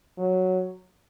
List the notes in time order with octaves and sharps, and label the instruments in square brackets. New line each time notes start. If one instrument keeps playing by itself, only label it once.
[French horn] F#3